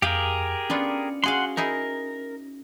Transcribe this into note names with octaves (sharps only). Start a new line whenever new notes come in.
F2 G4 G#4 A#4 F5 G5
B3 C#4 D4 F4 C#7
F#4 G#4 F5 F#5 C6
D#4 E4 G#4 A#4